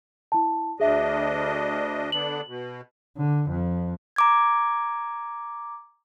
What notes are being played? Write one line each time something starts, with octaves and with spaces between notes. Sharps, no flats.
E4 A5
D2 D4 G#4 D#5 E5
D3 B3 D4 F#7
B2
D3
F2
A#5 D6 G#6